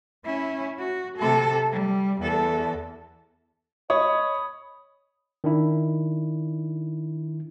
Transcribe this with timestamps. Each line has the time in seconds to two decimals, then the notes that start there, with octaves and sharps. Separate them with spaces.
0.25 C#4 E4
0.79 F#4
1.18 C3 A4
1.71 G3
2.21 E2 A4
3.90 C#5 D#5 B5 D#6
5.44 D#3 D4 E4